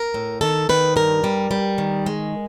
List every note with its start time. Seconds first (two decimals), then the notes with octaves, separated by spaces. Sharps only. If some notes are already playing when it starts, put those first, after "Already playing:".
Already playing: A#4
0.14 A2
0.41 D#3 A4
0.69 D#3 B4
0.96 G2 A#4
1.24 G3
1.51 G3
1.78 D#3
2.06 G#3